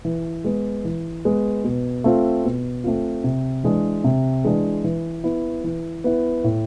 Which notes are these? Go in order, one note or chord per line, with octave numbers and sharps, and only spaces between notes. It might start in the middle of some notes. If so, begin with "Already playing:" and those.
E3
G#3 B3
E3
G#3 B3
B2
A3 C4 F4
B2
A3 C4 F4
C3
E3 G#3 D4
C3
E3 G#3 D4
E3
B3 E4
E3
B3 E4
A2